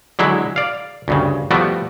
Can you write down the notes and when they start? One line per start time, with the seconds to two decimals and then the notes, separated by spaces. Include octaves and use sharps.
0.19 D3 F#3 G#3 E4
0.56 D5 F5
1.08 D2 G2 C#3
1.51 F3 G3 A3 B3 F#4 G4